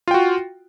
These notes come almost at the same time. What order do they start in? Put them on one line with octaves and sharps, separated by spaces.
F4 G5 F#4